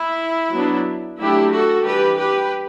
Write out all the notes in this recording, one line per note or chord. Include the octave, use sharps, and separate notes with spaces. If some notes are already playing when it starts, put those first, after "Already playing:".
Already playing: E4
F#3 B3 D4
F#3 A3 D4 E4 G4
F#4 A4
E3 G3 D4 G4 B4
G4 B4